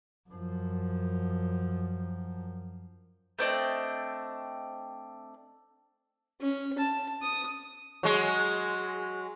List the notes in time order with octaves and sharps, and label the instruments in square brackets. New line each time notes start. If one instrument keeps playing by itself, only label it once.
[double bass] F#2 F3
[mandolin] A3 C4 D4 D#5
[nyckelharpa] C#4
A5
D#6
[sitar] F#3 G#3